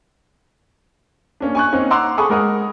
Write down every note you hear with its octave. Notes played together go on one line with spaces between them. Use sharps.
A#3 C#4 D4
G#5 C#6 F#6
A#3 C4 C#4 D#4
F#5 A#5 C6 D6 E6 F#6
G#4 A4 G#5 B5 C#6 D#6
G#3 A#4 F#5 D#6